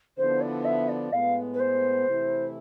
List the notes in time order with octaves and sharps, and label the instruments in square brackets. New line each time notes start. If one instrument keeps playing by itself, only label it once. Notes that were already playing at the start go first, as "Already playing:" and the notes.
[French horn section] D3 F3 B3 E4 [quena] C5
[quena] D5
E5
D5
[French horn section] A2 G#3 B3 [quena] F5
[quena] B4
C5
[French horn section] C3 E3 A3 E4